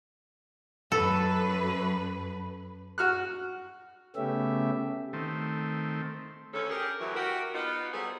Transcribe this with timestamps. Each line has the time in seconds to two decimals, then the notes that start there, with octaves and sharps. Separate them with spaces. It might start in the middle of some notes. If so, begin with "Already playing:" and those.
0.92 F#2 A4 B4
2.98 F#4 F6 F#6
4.16 C#3 A3 B3 C#4 G4 E5
5.13 D#3 A3 C4
6.54 D2 C#4 A4
6.70 G4 G#4 A#4
7.00 D2 E3 F#3
7.15 F#4 G4 A#4
7.54 B3 D#4 F4
7.93 F#3 G3 B3 G#4 A4 C5